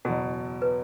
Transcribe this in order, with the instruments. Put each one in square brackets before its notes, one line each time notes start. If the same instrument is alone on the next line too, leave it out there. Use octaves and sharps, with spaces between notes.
[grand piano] F#1 E2 B2 [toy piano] F#4
[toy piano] B4